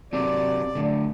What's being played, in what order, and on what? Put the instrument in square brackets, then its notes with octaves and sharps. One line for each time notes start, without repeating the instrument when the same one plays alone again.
[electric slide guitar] F#3 C4 G4 [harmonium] D5
[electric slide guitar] A2 D3